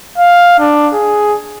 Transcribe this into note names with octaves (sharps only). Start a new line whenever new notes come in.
F5
D4
G#4